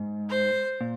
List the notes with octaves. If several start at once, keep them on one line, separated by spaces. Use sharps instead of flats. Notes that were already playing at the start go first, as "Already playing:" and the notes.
Already playing: G#2
C5
A#2